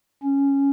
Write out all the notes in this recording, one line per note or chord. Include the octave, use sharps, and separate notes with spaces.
C#4